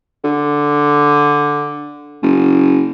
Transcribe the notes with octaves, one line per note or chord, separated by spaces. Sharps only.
D3
F#1